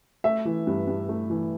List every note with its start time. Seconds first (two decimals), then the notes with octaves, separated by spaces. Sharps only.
0.24 A3 E5
0.45 E3
0.67 G2
0.88 G2
1.09 A3
1.30 E3